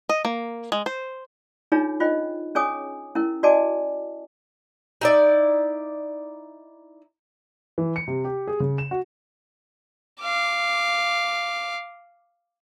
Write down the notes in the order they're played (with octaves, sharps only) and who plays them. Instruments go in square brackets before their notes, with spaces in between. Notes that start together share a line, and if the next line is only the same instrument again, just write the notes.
[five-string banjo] D#5
A#3
G#3
C5
[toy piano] D4 D#4 F4 G#4 C#5
F4 C5 D#5 G5
C#4 G#4 C#5 G#5 D6 D#6
C#4 E4 A#4
F#4 D5 D#5 G#5 A5 D6
[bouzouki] D#4 E4 D5
[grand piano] E3
C#7
C3
G4
G#4
C#3
E7
F#4
[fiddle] F5 D6